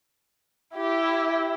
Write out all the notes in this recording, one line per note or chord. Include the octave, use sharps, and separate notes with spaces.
E4 G4